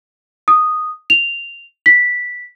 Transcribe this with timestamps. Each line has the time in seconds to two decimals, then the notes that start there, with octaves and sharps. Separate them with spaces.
0.48 D#6
1.10 F7
1.86 B6